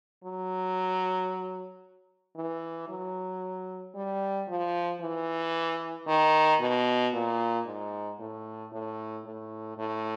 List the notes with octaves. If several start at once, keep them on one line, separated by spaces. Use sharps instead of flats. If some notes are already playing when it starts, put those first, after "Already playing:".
F#3
E3
F#3
G3
F3
E3
D#3
B2
A#2
G#2
A2
A2
A2
A2